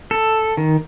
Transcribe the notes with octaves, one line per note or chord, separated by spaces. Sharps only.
A4
D#3